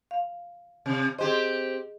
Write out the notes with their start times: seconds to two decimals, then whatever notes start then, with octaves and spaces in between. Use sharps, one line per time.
0.11 F5
0.86 C3
1.19 C4 G4 G#4 C5 D#5